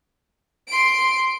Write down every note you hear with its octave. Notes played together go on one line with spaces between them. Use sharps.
C6 D7